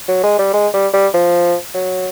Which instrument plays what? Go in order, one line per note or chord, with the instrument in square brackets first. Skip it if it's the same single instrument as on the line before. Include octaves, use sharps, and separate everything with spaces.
[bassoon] F#3
G#3
G3
G#3
G3
G3
F3
F#3